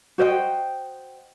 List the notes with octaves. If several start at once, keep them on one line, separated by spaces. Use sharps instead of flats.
F#4 C5 D#5 G5